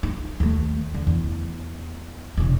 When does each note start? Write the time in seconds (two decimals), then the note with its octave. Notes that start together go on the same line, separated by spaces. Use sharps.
0.03 D#4 F4
0.40 D#2 A3
0.94 D3
1.07 E2
2.37 E1 C#3